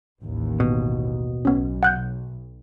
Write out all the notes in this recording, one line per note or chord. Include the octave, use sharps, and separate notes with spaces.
A1 D#2
B2
B1 B3 C#4
F#5 F#6 G6